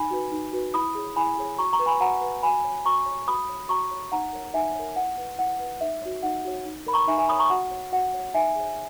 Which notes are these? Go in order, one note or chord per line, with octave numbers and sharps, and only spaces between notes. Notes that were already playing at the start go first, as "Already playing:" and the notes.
Already playing: D#4 G#5 B5
F#4 B4
D#4
F#4 B4
E4 B5 D#6
G#4 C#5
E4 G#5 B5
G#4 C#5
F#4 A#5 C#6
A#5 C#6
B4
G#5 B5
F#4 F#5 A#5
B4
F#4 G#5 B5
C#5
F#4 A#5 C#6
C#5
F#4 B5 D#6
C#5
F#4 A#5 C#6
C#5
D#4 F#5 A#5
A#4 C#5
D#4 E5 G#5
A#4 C#5
E4 F#5
B4
E4 F#5
B4
D#4 E5
F#4 C#5
D#4 F#5
F#4 C#5
D#4
A#4 C#5 B5
A#5 C#6
D#4 E5 G#5
E5 G#5
A#4 C#5 B5 D#6
A#5 C#6
F#4 F#5
C#5
F#4 F#5
C#5
D#4 E5 G#5
G#4 C#5